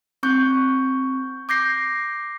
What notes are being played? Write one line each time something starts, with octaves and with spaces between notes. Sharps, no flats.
C4 C#6 G6
D6 G6 A#6 C7